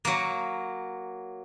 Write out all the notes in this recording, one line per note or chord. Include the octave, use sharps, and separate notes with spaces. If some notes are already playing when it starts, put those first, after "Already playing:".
F#3 A#3